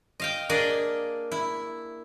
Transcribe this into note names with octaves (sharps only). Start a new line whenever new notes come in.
D#5 F5 G5
A#3 D4 G#4 D5 D#5
E4